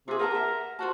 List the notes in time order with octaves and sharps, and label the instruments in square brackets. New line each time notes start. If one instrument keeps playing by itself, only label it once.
[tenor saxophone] C3 [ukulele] F4 G#4
[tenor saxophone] A#4 [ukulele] B4 F#5 A5
[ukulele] E5 F#5
[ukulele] F4 C5 A5 [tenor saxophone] F#4